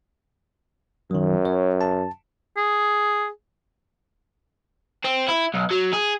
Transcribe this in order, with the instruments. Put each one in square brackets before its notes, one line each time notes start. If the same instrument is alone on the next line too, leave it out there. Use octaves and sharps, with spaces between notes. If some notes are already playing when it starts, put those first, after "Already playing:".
[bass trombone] F#2 [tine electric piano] D#3 F#3
[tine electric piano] C#5
A5
[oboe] G#4
[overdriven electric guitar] C4
E4
B1
F#3
G#4